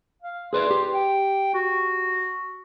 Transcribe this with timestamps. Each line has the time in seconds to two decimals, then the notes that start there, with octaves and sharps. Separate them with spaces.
0.22 F5
0.53 G#4 B4 D5 C6
0.71 G4
0.93 G5
1.54 F#4